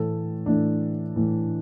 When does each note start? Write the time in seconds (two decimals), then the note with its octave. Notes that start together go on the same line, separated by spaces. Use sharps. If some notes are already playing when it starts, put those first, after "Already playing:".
Already playing: A2 E3 A3 A4
0.46 A2 E3 A3 D4
1.16 A2 E3 A3